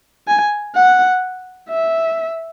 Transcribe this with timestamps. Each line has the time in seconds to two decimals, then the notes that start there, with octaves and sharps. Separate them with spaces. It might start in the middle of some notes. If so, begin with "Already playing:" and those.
0.28 G#5
0.75 F#5
1.70 E5